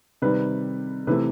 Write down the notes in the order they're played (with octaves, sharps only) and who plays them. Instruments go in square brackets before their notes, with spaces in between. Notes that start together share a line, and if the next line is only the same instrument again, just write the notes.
[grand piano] C3 D#3 G3 B4
C3 E3 A3 B4